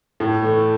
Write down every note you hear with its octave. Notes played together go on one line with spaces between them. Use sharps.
A2
E3 A3